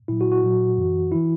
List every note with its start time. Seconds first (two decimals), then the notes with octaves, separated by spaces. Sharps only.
0.08 A#2 F#3 E4
0.21 F#4
0.32 F#4
0.44 A#2 F#3
0.78 F#2 E3
1.12 E3 E4